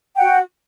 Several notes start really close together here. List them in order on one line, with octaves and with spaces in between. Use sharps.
G5 F#5 F#4